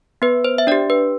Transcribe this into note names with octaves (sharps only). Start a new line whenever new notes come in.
B3 B4
C5
E5
D4 G4 D5
B4